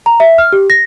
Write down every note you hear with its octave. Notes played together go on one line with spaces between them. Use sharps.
A#5
E5
F6
G4
A#6